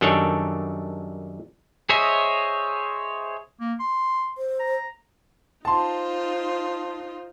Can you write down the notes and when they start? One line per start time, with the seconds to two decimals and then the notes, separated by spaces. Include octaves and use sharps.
0.01 F#2 D#3 G3 D4 A4 C#5
1.89 G#4 C5 C#5 D#5 E5
3.60 A#3
3.80 C6
4.37 C5
4.60 A#5
5.65 D#4 F4 C5 A5 C6